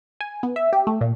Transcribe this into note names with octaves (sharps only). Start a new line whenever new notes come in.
G#5
B3
E5
G4
A3
A#2